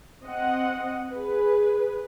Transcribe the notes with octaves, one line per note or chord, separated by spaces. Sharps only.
C4 D#5 F#5
G#4 B4